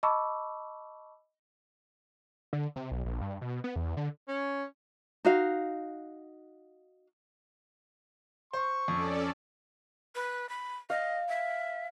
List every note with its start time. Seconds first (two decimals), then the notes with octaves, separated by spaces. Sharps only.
0.03 D#5 A5 B5 C#6 D6 E6
2.53 D3
2.76 C3
2.91 B1
3.05 A#1
3.21 G2
3.41 B2
3.64 B3
3.76 E2
3.97 D3
4.28 C#4
5.25 D#4 F#4 F5
8.53 C5 C#6
8.88 F2 C#4 A4 D5
10.15 B4
10.49 B5
10.90 D#5 F5
11.29 E5